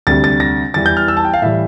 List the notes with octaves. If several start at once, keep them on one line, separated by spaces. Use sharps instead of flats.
D2 C3 G3 A6
A6
A#6
E2 E3 G3 A6
G6
F6
E6
A5
G5
F5
A2 E3 G3 E5